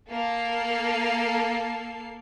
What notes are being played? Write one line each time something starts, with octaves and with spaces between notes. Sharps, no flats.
A#3 A4 C7